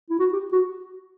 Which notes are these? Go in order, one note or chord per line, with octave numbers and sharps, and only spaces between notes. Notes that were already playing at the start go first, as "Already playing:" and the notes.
E4
F#4
G4
F#4